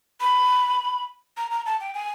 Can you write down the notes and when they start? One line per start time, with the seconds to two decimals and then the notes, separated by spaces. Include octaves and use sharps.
0.20 B5
1.37 A#5
1.51 A#5
1.66 A5
1.81 G5
1.94 G#5